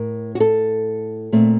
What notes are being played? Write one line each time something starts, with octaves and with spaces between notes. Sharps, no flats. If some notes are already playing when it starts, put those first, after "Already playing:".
Already playing: A2 A#4
F#4
A4
A#2 A3 C4